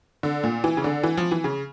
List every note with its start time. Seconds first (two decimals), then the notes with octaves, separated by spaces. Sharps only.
0.23 D3
0.44 A#2
0.64 E3
0.77 C#3
0.84 D3
1.03 E3
1.17 F3
1.31 E3
1.44 C#3